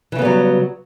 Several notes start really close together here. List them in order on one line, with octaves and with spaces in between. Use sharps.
E3 C#3 B3 G3 F#3